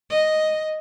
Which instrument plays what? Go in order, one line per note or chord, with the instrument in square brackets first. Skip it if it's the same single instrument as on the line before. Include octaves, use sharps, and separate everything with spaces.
[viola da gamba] D#5